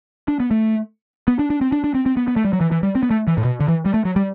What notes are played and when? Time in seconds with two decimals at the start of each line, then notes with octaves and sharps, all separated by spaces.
0.28 D4
0.40 B3
0.51 A3
1.28 B3
1.39 D4
1.50 D4
1.61 C4
1.72 D4
1.84 D4
1.94 C4
2.06 C4
2.17 B3
2.28 B3
2.36 A3
2.45 G3
2.53 F#3
2.61 E3
2.71 E3
2.83 G3
2.95 C4
3.03 B3
3.11 A3
3.27 E3
3.38 A2
3.45 B2
3.60 D3
3.68 E3
3.85 G3
3.94 A3
4.05 F#3
4.16 G3